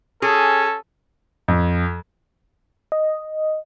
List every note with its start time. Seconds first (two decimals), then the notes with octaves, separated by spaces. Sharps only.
0.22 C#4 G#4 A4
1.48 F2
2.92 D#5